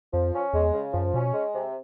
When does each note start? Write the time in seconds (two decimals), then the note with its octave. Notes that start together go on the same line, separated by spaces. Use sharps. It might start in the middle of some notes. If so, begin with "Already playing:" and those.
0.13 F2 F3
0.34 C#4
0.53 E2 G#3
0.74 C#3
0.93 F#2 F3
1.14 B2 C#4
1.34 G#3
1.54 C3